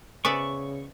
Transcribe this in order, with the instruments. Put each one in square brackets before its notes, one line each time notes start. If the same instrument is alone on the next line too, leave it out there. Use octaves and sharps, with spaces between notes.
[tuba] C#3 [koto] B3 D5 E5 [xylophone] C5 G#5 [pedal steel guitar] C#6